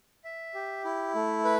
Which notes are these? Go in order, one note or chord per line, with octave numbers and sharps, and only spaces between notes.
E5
G4
E4
A3
B4